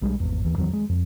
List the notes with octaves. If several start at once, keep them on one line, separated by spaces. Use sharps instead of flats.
B1 G3 G#3 D4
G#1 E2
D#2 E3
E2 D#3 F#3 C4
G#3
F2